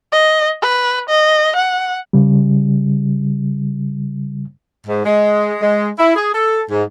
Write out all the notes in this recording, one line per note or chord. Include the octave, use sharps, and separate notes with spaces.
D#5
B4
D#5
F#5
C#3 G3
G#2
G#3
G#3
E4
G#4
A4
G#2